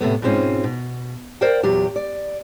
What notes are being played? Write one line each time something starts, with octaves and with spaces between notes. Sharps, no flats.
A2 C3 A3 B3
G#2 B2 G#3 C4 C#4 F4
B2
A#4 C5 D5 F5 G5
E2 A#2 F#3 G4
D5